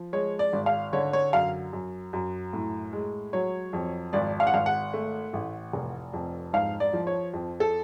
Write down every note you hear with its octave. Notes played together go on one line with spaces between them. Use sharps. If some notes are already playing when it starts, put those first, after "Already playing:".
Already playing: F3
G#3 C#5
D5
G#1
F5
D3 C#5
C#5
F#2 F5
F#2
F#2
A2
G#3
F#3 C#5
F2
G#1 D5
F5
F#5
G#1 F5
F#5
A3
A1
F1
F2
G#2 F5
D5
F3
C#5
F2
A4